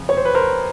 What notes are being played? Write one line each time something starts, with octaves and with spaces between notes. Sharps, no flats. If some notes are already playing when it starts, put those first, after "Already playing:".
Already playing: F2 C#3
C#5
C5
B4
A#4 C5